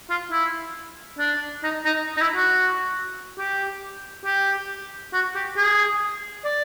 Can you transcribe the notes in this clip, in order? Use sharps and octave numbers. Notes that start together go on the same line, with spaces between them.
F4
E4
D4
D#4
D#4
D#4
E4
F#4
G4
G4
F#4
G4
G#4
D5